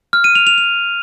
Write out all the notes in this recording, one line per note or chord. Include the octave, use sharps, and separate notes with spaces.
F6
D#7
F7
F7
F7